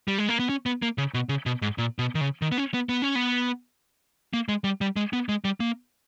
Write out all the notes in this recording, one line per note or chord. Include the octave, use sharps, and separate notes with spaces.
G3
G#3
A#3
B3
C#4
B3
A#3
C#3
B2
C#3
B2
G#2
A#2
B2
D#3
C#3
D#3
B3
C#4
B3
B3
C#4
B3
A#3
G#3
G3
G3
G#3
B3
G#3
G3
A#3